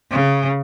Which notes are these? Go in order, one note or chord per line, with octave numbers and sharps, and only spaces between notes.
C#3